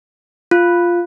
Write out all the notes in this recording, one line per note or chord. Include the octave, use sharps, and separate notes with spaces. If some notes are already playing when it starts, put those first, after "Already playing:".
F4